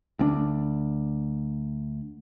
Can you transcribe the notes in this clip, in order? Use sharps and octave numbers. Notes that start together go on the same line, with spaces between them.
D2 C4 D4